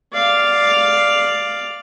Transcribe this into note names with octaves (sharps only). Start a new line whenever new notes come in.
D5 F5